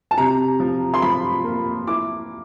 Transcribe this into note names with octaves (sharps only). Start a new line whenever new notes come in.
A5
C3 A#5
F3
C6
F3 B5
A#3
E4 D6